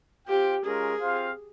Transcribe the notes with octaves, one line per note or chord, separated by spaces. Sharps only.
C4 F4 G4 C5 G5
G#3 C#4 F4 G#4 A#4
C4 F4 C5 F5